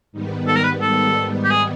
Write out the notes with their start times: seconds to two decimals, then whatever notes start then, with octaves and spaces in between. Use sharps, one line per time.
0.12 G#2 D#3 G3 B3
0.47 A4
0.56 A#4
0.64 B4
0.81 A4
1.44 G4
1.50 G#4